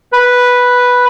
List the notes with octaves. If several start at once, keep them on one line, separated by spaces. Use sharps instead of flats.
B4